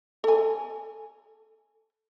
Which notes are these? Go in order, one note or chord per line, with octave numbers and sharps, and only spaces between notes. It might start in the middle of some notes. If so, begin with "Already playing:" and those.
A4 G#5